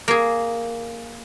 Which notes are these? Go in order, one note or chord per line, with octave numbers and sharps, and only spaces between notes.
A#3 G#4